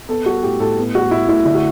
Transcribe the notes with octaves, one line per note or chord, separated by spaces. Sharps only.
B3 A4
G3 F#4
A2 G4
A2 A4
B3
G3 F#4
A2 E4
A2 E4
D3 E4
F#4